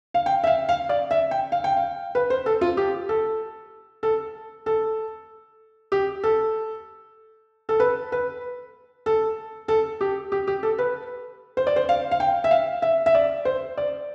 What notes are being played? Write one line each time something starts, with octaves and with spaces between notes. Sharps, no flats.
F5
G5
E5
F5
F5
D5
E5
G5
F5
G5
F5
B4
C5
A4
F4
G4
A4
A4
A4
G4
A4
A4
B4
B4
A4
A4
G4
G4
G4
A4
B4
C5
D5
C5
F5
F5
G5
E5
F5
E5
E5
D5
C5
D5